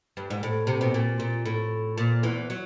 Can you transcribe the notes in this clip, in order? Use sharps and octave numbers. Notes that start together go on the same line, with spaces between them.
G2
G#2
A2
C3
B2
A#2
A#2
A2
A#2
E2 E3
F#3